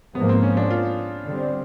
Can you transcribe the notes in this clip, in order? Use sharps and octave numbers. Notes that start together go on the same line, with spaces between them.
G#2 F3 A#3 B3
C4
C#4
D4
F4
D3 G3 C4